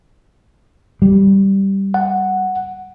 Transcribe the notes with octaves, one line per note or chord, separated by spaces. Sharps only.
G3
F#5